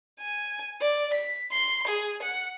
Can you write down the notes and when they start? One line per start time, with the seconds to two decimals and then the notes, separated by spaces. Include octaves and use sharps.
0.20 G#5
0.82 D5
1.14 B6
1.52 C6
1.88 G#4
2.23 F#5